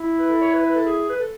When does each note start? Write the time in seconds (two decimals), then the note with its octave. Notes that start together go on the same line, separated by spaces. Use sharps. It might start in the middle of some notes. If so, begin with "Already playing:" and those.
Already playing: E4
0.19 B4
0.30 A4
0.41 C#5
0.53 B4
0.64 B4
0.75 A4
0.86 G#4
1.09 B4
1.20 A4